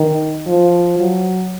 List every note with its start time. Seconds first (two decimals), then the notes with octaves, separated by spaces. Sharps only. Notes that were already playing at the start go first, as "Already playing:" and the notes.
Already playing: D#3
0.47 F3
0.99 F#3